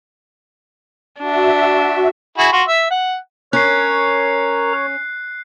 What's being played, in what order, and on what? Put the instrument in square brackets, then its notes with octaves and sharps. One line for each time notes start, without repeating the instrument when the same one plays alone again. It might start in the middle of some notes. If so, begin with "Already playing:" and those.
[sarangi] D4 [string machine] F#4 E5
[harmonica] E4 F#4 G#4
F4 F#4
E5
F#5
[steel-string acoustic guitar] C#4 [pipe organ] A#4 A#5 [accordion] C#5 [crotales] F#6 C7